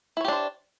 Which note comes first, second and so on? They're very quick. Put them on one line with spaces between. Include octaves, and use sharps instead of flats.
E4 C#5 G4 D4 C5